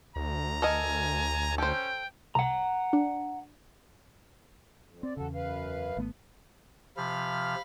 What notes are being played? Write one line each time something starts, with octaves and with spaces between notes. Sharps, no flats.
D2 A#5
A4 A#4 D#5 G#5
C#4 A4 C5 G5
C2 F#5 A#5
D4
F2
C4 D5
E2 C#3 F#4 A4
F#2 B4 F5
G#1 A3 B3
C3 F3 F5 B5 F6